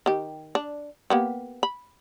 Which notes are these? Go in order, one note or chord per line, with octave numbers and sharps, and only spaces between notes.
D#3 G4
D4
A#3 B3 G4
B5